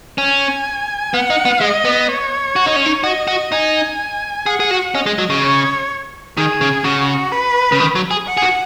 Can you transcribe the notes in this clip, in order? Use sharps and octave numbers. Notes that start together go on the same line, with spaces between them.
C#4 G#5
B3 F#5
D#4
B3
G#3 D#5
B3
C#5
F#4
D#4
C#4
D#4
F#4 D#5
F#4
D#4 G#5
G#4 F#5
G#4
F#4
C#4 D#5
G#3
F#3
C#3
C#5
D#3 G#4
C#3
C#3 F#4
B4
C#3
D#3
F#3
G#4
F#5
G#4
F#4